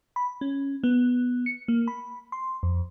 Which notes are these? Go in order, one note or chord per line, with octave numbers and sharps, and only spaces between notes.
B5
C#4
B3
C#7
A#3
B5
C6
F2